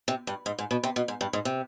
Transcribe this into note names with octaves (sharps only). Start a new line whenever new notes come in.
C3
G2
G#2
G#2
B2
C3
B2
G#2
G2
G#2
C3